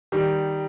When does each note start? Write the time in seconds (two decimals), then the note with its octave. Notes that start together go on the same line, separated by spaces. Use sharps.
0.12 D#3 G3